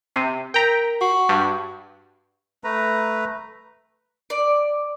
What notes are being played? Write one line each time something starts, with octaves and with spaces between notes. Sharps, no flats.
C3 C7 D#7
A#4 G5 A#5 B6 D7
F#4 C#6 C7
G2
A3 B4 A#5
D5